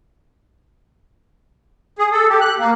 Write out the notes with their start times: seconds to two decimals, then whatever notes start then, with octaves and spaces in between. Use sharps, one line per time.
1.99 G#4
2.12 A4
2.29 G4
2.41 F#6
2.59 A#3